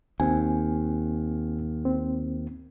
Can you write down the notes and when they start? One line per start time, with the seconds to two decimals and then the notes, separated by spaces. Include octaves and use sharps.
0.20 D#2 C4 G#5
1.85 C4